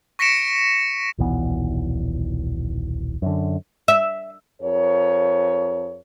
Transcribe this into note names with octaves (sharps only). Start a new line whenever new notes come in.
C#6 A#6 B6 C#7 D7 E7
D#1 B1 E3 B3
F#2 D3
E5
F2 G#4 A#4 C#5